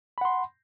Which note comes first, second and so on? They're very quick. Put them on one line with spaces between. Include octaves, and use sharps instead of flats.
B5 F#5 C6